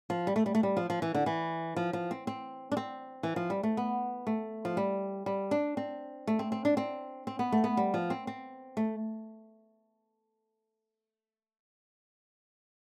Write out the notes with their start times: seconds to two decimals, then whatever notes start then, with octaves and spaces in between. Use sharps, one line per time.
0.10 F3
0.27 G3
0.36 A3
0.46 G3
0.55 A3
0.63 G3
0.77 F3
0.90 F3
1.02 E3
1.14 D3
1.26 E3
1.76 F3
1.93 F3
2.11 C4
2.27 C4
2.72 D4
2.77 C4
3.23 E3
3.36 F3
3.50 G3
3.63 A3
3.77 B3
4.27 A3
4.65 F3
4.77 G3
5.26 G3
5.51 D4
5.77 C4
6.27 A3
6.39 C4
6.52 C4
6.65 D4
6.77 C4
7.27 C4
7.39 B3
7.52 A3
7.64 B3
7.77 G3
7.94 F3
8.10 C4
8.27 C4
8.77 A3